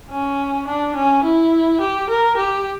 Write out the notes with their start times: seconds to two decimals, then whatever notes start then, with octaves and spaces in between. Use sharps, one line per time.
0.11 C#4
0.67 D4
0.96 C#4
1.24 E4
1.81 G4
2.09 A#4
2.37 G4